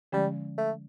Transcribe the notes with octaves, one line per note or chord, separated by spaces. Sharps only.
D3 F3 G3 G#3 C#4
A3